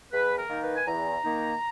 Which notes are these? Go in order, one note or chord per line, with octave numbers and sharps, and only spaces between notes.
E2 B4
A#4
D#3 A#3 D#4
B4
G#5
E2 A#5
D#3 A#3 D#4